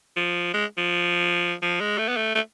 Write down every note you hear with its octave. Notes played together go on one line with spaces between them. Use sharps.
F3
G#3
F3
F3
G#3
A3
B3
A3
A3